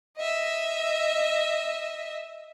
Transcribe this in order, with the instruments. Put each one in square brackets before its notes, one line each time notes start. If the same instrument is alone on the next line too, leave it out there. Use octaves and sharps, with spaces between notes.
[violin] D#5 E5